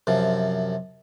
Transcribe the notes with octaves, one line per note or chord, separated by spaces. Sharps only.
F#2 C3 F3